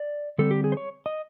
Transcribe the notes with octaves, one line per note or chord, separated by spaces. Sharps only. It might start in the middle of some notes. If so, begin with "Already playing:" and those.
Already playing: D5
D3 G3 C4 A4
G4
G#4
C5
C#5
D#5